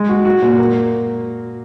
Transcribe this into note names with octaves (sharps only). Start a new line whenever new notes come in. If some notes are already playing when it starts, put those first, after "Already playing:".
Already playing: G#3
F#4
F#4
A#2
A#3